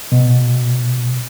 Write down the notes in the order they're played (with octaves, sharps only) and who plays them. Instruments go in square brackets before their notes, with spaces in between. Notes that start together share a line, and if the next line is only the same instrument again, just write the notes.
[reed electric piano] B2